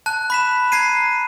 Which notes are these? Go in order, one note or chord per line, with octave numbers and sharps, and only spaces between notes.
A5 F#6
B5 B6 E7
A#5 G#6 C7 D#7